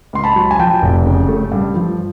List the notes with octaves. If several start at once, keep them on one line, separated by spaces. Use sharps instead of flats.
C#2 C6
A5 B5
F#3
G#5
F3 G5 A5
F1
C#3
A3
G2
F3